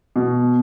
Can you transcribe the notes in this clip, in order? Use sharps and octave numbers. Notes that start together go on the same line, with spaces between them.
B2